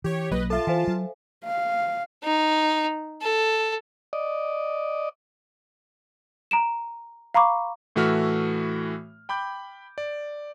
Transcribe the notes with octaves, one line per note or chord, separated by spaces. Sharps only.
E3 G4 C#5
B1 F#3 A#3 B4 D#5
F4 A4 E5 A5
E3 C5 F5 G#5
F#3
F5
D#4
A4
D5 D#5
A#5 D7 E7
F5 A#5 B5 C#6 D6
A2 E3 A3 F#4 E5 F6
G5 B5 D6 G6
D5